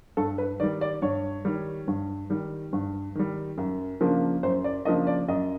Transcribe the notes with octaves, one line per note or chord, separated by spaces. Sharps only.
G2 A4
B4
D#3 G3 D5
D5
G2 C#5
D#3 G3
G2
D#3 G3
G2
D#3 G3
F#2
C#3 F3 A#3 D4
F#2 C5
D5
C#3 F3 A#3 D4 D#5
D5
F#2 D#5